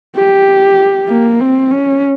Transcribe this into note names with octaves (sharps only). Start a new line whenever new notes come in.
G4
A#3
C4
C#4